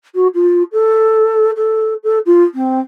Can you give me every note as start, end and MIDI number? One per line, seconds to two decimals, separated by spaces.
0.14 0.27 66
0.34 0.63 65
0.72 1.50 69
1.56 1.94 69
2.03 2.18 69
2.26 2.44 65
2.54 2.79 60